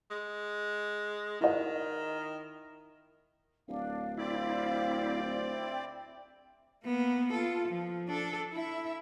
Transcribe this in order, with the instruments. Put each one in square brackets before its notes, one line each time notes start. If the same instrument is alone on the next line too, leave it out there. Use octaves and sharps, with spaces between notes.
[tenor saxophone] G#3
[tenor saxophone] D#3 [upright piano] E4 D#5
[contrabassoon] D1 [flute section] D4 F5
[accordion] C4 D5 [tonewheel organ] E4 [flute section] F5
[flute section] E4 G5
[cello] A#3 B3
F4 A4
F3
D4 A4
E4 E5